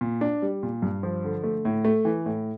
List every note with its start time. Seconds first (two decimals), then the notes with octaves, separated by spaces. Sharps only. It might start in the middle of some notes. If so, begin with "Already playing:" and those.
0.01 A#2
0.21 D4
0.42 G3
0.63 A#2
0.82 G2
1.03 F3
1.24 D3
1.44 A3
1.65 A2
1.85 A3
2.05 E3
2.26 A2